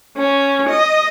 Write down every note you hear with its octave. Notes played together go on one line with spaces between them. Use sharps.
C#4
D#5